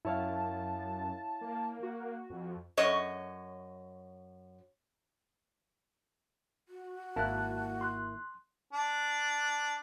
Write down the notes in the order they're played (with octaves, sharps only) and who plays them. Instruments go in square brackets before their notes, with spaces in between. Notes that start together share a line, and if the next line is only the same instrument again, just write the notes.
[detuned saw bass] F#2 [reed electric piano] E4 C#5 F5 [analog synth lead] A5
[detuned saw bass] A#3
[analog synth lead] F#4
[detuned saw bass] F2
[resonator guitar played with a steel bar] F#2 C#5 D#5
[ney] F#4
[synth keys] G#1 A#3 E4 [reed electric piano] A5 F#6
[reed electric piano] C6 F#6
[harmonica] D4